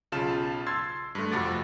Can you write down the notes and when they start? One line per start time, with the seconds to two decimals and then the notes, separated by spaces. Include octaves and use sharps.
0.12 B1 C#3 F4 A5 E7
0.67 C6 E6 G#6 A6 C7
1.15 G2 A3
1.32 F2 C3 F3 F#4 D6 A6